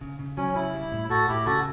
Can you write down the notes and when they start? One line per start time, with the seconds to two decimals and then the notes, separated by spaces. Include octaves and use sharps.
0.01 C#3
0.19 C#3
0.37 F#3 C#4
0.55 C#3 E4
0.73 G3
0.92 A2
1.10 A2 F#4 A4
1.28 A2 E4 G4
1.46 C#3 F#4 A4